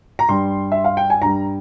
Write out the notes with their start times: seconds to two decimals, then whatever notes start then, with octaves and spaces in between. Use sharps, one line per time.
0.19 A#5
0.29 G2 G3 C6
0.72 E5
0.84 F5
0.97 G5
1.10 G#5
1.22 G2 G3 A#5